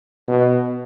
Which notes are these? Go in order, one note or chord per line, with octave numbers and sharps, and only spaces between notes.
B2